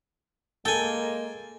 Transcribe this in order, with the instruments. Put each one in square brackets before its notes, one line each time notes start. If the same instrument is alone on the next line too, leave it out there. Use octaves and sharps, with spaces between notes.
[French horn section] G#3 A#3 [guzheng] A4 [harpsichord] G5 G#5